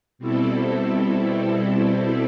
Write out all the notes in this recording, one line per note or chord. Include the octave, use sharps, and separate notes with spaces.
B2 G3 C4 E4 A4